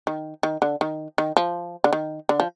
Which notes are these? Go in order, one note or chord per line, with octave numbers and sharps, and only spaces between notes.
D#3
D#3
D3
D#3
D#3
F3
D3
D#3
D3
F3